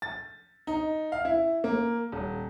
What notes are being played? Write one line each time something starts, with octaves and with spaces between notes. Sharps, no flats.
A6
D#4
F5
E4
A#3
D#1